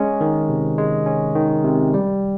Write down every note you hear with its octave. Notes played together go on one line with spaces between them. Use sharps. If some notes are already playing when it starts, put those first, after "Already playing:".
Already playing: G#3 C#4
D#3
C3
G#3
C#4
D#3
C3
G3